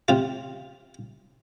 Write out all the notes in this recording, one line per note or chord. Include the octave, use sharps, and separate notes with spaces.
C3 F4